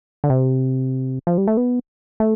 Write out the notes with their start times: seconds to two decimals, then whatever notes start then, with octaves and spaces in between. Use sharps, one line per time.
0.24 D3
0.30 C3
1.27 F3
1.38 G3
1.48 A3
1.57 B3
2.20 A3